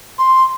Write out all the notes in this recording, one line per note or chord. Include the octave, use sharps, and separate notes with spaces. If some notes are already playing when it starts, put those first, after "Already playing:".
C6